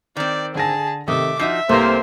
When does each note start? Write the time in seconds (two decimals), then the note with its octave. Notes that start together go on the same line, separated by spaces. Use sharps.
0.17 D#3 C4 D5
0.55 D3 G#4 G#5 A5 A#6
1.08 C3 D#3 A3 E5 D6 D#6
1.39 F3 D#4 F#4 E5 C7
1.69 C2 C3 A3 A#3 B4 C5 A#6